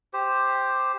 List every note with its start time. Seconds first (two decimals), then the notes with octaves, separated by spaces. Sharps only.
0.13 G4 C5